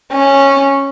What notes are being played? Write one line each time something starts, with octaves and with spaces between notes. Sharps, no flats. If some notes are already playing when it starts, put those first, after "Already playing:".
C#4